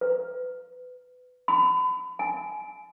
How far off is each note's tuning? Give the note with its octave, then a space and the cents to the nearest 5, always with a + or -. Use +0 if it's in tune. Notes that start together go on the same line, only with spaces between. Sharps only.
B4 +20
B5 +35
G#5 +35